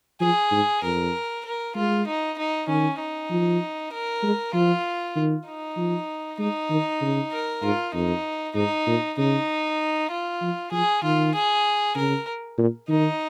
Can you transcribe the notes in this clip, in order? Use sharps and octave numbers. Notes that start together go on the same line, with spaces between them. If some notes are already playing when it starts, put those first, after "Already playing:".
F3 G#4
G#2
F2 A#4
A#4
G#3 F4
D#4
D#4
D#3 C#4
D#4
F3
A#4
G#3
F3 F4
D#3
D#4
F3
G#3 D#4
D#3
C#3
A#4
G#2 F4
F2 D#4
G#2 D#4
A#2
C#3 D#4
F4
F3
F3 G#4
D#3 F4
G#4
C#3 A#4
A#2
D#3 D#4